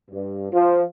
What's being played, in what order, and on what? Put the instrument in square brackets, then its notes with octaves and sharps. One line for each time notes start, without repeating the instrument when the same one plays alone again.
[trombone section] G2
F3